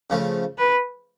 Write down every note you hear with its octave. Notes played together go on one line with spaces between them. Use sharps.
C#3 F3 A3
B4